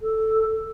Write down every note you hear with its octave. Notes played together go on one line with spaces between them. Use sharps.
A4